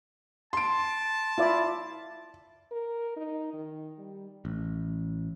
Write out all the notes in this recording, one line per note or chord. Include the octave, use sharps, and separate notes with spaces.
A5 C6 D7
E4 F4 D5
A#4
D#4
D#3
G3
A1